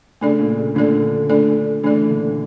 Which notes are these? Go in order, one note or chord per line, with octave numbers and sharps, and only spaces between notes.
C#3 A3 D4 A4 D5
A#2
C#3
A#2 D3 A3 D4 A4 D5
A3 D4 A4 D5
C#3 E3 A3 D4 A4 D5
A#2 D3